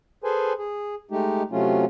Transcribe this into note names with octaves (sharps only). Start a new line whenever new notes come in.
G#4 A4 B4 C5 G#5
G#4
G#3 A3 D#4 G4
C3 F#3 A3 C#4 F4